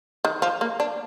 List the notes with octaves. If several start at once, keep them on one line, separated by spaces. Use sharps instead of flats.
D#3
F3
A#3
D4